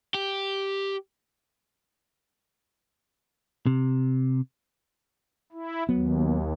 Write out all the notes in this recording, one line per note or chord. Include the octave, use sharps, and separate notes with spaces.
G4
C3
E4
D#2 F#3 B3